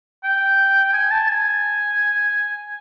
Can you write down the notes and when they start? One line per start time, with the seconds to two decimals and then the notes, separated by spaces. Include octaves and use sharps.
0.24 G5
0.93 G#5
1.11 A5
1.28 G#5